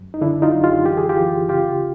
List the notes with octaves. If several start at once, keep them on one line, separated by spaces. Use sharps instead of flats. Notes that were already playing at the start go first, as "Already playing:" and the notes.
Already playing: F#2
D#4
D3 D4 E4
D#4 F4
F#2
F4 G4
E3 G4
G#4
F4 G4
E3
C#3 F4 G4